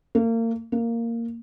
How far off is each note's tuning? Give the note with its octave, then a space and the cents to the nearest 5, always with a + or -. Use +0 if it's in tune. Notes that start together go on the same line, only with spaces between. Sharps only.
A#3 -35
A#3 -10